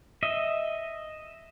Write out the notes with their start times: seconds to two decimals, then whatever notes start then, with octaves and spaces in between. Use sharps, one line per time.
0.23 D#5 E5